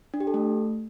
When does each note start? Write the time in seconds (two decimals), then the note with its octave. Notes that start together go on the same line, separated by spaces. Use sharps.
0.14 D4
0.20 G4
0.27 A4
0.34 A3